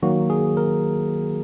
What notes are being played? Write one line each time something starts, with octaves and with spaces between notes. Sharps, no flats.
D#3 F#3 A#3 F#4
G#4
A#4